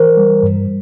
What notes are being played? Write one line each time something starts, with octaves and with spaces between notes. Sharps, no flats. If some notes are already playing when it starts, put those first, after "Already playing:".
Already playing: E3 A#4 C5
G3
G2